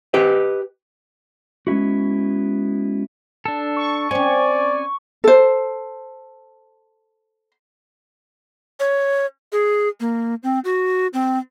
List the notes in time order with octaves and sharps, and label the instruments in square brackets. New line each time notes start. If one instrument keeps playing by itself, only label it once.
[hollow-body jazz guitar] G4 B4 D#5
[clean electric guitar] G#3 B3 C#4 E4 F#4
[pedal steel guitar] D4 A4
[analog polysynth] C#6
[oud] C4 C#4 [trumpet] D5 [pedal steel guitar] G#5
[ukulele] A4 C5
[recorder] C#5
G#4
A#3
C4
F#4
C4